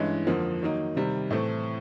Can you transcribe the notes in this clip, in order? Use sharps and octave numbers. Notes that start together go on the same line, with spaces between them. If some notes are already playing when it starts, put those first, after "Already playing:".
Already playing: G2 E3 G#3 C#4 E4
F2 D3 F3 A#3
D#3 F#3 A#3 D#4
C3 D#3 G3
A2 E3 A3 C4